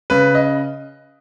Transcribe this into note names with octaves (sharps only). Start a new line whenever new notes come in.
C#3 B4
D#5